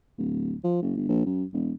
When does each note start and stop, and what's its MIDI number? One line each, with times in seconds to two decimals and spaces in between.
0.18 0.55 26
0.64 0.80 53
0.82 0.95 30
0.97 1.06 31
1.08 1.24 34
1.26 1.44 42
1.53 1.72 28